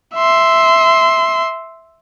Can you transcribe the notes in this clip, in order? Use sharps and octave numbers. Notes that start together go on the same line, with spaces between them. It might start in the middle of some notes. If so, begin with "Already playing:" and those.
E5 C6